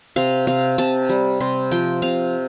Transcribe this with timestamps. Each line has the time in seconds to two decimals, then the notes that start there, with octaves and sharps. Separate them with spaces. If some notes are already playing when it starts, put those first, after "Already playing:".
0.16 C3 F5
0.47 C3 F5
0.78 C3 A5
1.09 G3
1.40 C3 C6
1.71 F3 G5
2.02 C3 F5